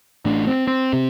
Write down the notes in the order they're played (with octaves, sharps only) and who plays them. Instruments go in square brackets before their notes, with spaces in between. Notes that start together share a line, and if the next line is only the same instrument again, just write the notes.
[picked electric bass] A1 A2 D4
C4
C4
C3